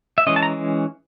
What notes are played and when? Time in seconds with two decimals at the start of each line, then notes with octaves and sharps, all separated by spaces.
0.18 E5
0.27 E3 G#3 C#4 D#5
0.36 A5
0.43 A#5